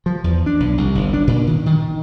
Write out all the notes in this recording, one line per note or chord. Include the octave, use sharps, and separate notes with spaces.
F3
E2
D4
B1
C2
G1
D4
A#2
D#3
D#3